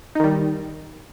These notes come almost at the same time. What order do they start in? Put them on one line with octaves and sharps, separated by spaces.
D#4 D#3 G3